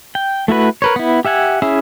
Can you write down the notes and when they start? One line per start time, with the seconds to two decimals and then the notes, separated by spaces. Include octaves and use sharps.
0.15 G5
0.48 A3 E4 F#4 B4
0.82 A#4 B4 C#5
0.96 B3 E4
1.25 G4 E5 F#5 G#5
1.62 C#4 E4 G#4 E5